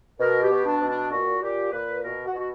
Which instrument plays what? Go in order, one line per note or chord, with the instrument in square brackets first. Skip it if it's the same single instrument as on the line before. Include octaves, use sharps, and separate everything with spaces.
[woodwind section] B2 A#4
G4
B2
D4
B2
D4
A#2 F#4
A#2 G4
A#2 B4
B2 A#4
F#4
B2
F#4